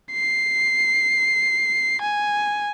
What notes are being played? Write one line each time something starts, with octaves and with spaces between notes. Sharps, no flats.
C7
G#5